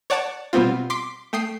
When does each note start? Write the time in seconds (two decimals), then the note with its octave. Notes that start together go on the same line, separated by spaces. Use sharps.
0.10 C#5 D5 F#5 A5 D6 A6
0.53 B2 G3 B3 C4 F4
0.90 C6 D6 B6
1.33 A3 G5 D#6 C7